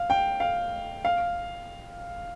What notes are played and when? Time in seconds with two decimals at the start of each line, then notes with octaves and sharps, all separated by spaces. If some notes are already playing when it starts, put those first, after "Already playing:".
Already playing: F5
0.10 G5
0.40 F5
1.05 F5